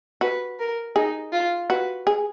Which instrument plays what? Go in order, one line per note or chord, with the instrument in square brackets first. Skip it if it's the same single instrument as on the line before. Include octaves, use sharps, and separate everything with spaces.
[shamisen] F#4 [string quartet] B4
[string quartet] A#4
[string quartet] D#4 [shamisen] G#4
[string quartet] F4
[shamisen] F#4 [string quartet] B4
[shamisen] G#4